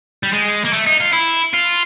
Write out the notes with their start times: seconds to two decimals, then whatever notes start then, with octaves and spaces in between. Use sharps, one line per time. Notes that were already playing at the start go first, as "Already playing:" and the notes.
0.23 G3
0.33 G#3
0.65 A#3
0.73 A3
0.86 D#4
1.00 F4
1.13 E4
1.54 F4